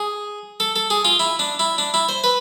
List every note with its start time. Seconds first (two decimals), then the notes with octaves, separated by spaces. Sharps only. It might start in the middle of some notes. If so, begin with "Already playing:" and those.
Already playing: G#4
0.60 A4
0.76 A4
0.90 G#4
1.05 F4
1.20 E4
1.39 D4
1.59 E4
1.78 D4
1.94 E4
2.09 C5
2.24 B4